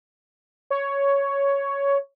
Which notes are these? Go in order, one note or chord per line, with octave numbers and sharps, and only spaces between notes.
C#5